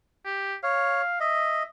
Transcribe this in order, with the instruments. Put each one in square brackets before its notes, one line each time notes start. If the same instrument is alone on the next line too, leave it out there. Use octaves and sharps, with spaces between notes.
[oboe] G4
[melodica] C#5 [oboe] F5
[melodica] D#5 [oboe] E5